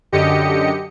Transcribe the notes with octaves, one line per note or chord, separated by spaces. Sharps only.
F#2 D3 G4 D#5 C#7